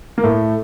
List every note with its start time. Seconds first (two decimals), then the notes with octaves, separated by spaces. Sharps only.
0.18 A#3
0.23 A2 A3